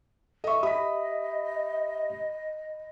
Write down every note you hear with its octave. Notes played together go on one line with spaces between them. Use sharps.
A4 D#5 E5 C#6
G4 D#5 E5 B5 D#6 B6